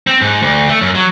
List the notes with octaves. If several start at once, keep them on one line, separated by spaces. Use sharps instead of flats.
C4
G#2
D2
A3
F#2
F#3